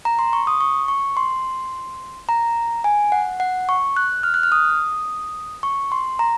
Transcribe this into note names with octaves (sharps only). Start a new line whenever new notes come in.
A#5
C6
C#6
D#6
C#6
C#6
C6
A#5
G#5
F#5
F#5
C#6
F#6
F6
F#6
F6
D#6
C#6
C6
A#5